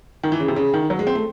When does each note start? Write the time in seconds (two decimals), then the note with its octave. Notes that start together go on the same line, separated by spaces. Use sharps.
0.23 D#3
0.32 E3
0.40 C#3
0.48 C3
0.56 C#3
0.74 D#3
0.90 F#3
0.99 G#3
1.07 C4
1.15 A3